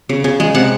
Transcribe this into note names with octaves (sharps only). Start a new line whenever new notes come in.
C#3
C#3
G#3
C3 F#5